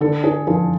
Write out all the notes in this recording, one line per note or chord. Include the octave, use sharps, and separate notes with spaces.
D3 A4
G#4
F3 G#4